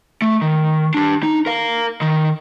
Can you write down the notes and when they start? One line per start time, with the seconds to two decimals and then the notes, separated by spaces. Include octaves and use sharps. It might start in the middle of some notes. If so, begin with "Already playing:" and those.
0.22 A3
0.41 D#3
0.94 D4 G4
1.23 D#4
1.46 A#4 F5
2.01 D#3